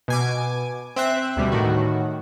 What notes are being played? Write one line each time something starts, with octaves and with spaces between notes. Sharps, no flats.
B2 G#5 D6
C4 E5 F#6
D2 B2 G3
A2 D#3 F#4